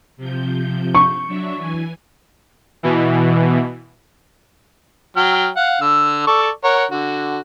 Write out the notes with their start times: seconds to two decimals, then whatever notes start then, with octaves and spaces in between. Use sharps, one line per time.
0.17 C3 F3 G6
0.95 C#6
1.27 F#3 D4 E5
1.57 E3 G#5
2.83 B2 E3
5.17 F#3 G5 F6
5.56 F5 F#5
5.81 D3 E6
6.27 A4 D5 C#6
6.64 A#4 C#5 F#5
6.91 D3 F#4